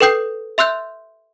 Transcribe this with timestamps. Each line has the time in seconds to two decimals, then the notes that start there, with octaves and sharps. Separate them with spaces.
0.01 A4 B4 G5 D#6 G6 C7
0.58 E5 C6 E6 F#6 G6